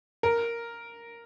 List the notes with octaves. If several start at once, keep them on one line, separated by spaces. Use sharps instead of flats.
A#4